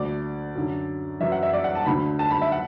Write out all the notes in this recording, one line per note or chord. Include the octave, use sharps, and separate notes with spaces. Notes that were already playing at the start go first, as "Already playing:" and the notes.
Already playing: D2 D3 D5
F#2 D3
F#2 E3 E5
F#5
E5
D5
F#5
A5
D2 D3 B5
A5
B5
E5
F#5